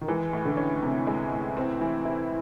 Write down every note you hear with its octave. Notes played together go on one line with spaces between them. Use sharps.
D#3
E3 G#3
A2
D3
C#4
C3 E3
G#3
A2
C4
E3
E4